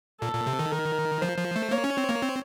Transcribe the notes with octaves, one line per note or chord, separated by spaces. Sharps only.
A#2 A4
A#2
C3
D#3
A#4
F3 C5
F3
A3
A#3 C#5
C#4
C4
A#3
C4